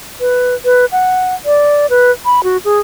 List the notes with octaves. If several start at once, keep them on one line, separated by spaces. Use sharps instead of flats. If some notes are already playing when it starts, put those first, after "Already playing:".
B4
B4
F#5
D5
B4
B5
F#4
G#4